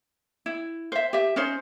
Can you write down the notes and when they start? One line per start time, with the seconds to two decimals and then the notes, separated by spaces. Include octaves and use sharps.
0.46 E4
0.92 C5 E5
1.13 G4 E5
1.36 C#4 D#4 C5